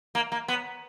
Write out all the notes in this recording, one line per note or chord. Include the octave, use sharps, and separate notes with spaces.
A#3
A#3
B3